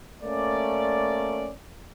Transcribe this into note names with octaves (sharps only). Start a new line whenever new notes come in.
A3 A#3 C#4 D5